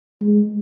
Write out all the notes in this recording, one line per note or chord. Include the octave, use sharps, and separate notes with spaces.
G#3